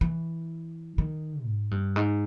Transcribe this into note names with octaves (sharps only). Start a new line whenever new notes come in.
E3
D#3
G#2
G2
G#2